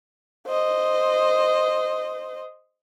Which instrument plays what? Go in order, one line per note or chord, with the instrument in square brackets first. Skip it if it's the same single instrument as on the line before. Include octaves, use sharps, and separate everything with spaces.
[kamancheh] C5 D#5